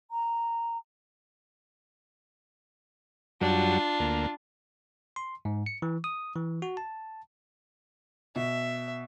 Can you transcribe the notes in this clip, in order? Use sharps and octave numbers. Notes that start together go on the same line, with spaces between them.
A#5
F#2 F#3 G3 D4 F4
D2 A#3
C6
G#2
C#7
E3
D#6
E3
F#4
A5
B2 E5